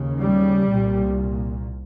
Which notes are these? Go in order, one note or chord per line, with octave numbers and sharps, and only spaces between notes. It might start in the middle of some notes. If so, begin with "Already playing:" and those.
Already playing: D#2 C#3
G3
C2 A#2